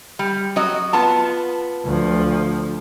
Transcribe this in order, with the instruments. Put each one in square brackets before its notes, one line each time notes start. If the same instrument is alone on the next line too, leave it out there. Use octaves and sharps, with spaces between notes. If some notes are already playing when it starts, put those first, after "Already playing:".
[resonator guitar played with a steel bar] G3
F#3 F#4 D#5
B3 F4 A5
[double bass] D2 F3